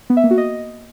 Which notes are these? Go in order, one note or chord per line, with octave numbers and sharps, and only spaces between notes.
B3
E5
A#3
F#4
D#5